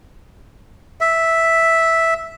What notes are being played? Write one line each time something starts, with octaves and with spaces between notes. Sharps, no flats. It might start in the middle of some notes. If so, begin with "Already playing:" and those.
E5